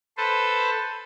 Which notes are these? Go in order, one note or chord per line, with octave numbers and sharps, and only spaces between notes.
A4 B4 C5